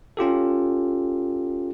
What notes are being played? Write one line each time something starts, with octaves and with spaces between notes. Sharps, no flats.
C#4 F4 G4 A4